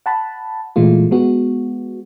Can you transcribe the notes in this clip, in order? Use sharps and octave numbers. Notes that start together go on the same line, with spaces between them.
F#5 A5 B5
A#2 E3 G#3 A3 F4
G#3 B3 F#4